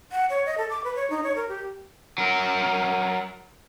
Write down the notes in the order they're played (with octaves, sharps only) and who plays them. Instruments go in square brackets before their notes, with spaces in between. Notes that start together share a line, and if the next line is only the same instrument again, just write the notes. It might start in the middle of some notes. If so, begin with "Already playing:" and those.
[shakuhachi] F#5
C#5
D#5
A4
D6
B4
C#5
D#4
C#5
A#4
G4
[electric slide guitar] F#3 A#4